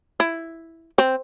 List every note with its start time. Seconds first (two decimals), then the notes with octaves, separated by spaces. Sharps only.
0.20 E4
0.98 C4